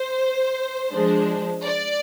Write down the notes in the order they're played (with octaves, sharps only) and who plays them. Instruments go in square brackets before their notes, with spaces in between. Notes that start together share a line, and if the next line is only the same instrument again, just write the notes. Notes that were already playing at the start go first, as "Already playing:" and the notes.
Already playing: [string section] C5
F3 G#3 D4
D5